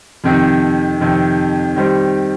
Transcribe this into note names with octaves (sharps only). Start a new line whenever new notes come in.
F2 C3 D#3
F2 C3 D#3
D#3 G3 C4